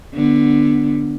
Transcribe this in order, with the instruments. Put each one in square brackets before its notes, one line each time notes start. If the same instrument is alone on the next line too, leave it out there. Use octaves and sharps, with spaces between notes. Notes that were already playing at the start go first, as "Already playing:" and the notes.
[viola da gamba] D3 B3